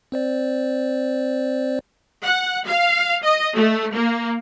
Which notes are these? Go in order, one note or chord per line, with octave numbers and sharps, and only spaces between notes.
C4 C5 D5
F#5
F5
D#5
A3
A#3